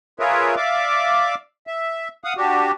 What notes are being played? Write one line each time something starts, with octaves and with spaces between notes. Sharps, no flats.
F4 G#4 A#4 B4 C#5 E5
D5 E5 F5 D6
E5
F5 F#5 D#6
D4 F#4 G4